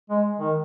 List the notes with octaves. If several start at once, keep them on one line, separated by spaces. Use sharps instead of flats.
G#3
D#3